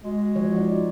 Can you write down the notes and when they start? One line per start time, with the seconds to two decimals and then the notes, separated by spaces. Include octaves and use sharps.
0.04 G#3 F#4
0.36 E3 F3 C#5
0.54 D#4 D5 F#5